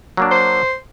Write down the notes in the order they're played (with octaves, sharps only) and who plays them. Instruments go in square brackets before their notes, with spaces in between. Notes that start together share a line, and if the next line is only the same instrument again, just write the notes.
[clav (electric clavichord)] F#3 A#3 D4
[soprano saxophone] C5